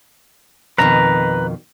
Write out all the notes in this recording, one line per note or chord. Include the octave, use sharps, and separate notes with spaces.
F2 B2 D#3 B4 A#5